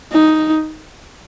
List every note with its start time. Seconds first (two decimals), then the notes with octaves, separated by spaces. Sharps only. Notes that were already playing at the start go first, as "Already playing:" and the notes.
0.12 D#4